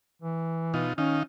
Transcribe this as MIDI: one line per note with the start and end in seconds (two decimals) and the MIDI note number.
0.22 0.84 52
0.74 0.93 47
0.74 0.93 63
0.74 0.93 65
0.98 1.23 51
0.98 1.20 61
0.98 1.23 63
0.98 1.23 77